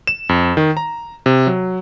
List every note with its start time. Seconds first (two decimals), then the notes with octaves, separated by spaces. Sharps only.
0.07 E7
0.29 F2
0.57 D#3
0.77 A#5
1.26 C3
1.47 F#3